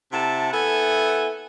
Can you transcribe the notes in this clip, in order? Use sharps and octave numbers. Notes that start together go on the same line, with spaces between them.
C3 E4 F#5 A5
B3 E4 A4 E5 F#5 G#5